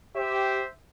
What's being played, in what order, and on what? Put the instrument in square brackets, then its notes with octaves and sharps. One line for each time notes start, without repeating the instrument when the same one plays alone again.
[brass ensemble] G4 [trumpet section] C5 E5